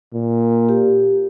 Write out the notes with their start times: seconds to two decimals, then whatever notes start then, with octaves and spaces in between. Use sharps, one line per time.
0.13 A#2
0.69 G4